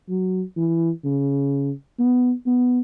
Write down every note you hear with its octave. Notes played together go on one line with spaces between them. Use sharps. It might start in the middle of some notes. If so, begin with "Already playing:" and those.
F#3
E3
C#3
B3
B3